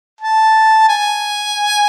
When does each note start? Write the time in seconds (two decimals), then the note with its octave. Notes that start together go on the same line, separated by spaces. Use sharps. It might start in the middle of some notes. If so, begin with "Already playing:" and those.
0.21 A5
0.89 G#5